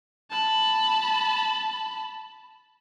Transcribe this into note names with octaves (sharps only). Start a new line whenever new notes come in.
A5 B5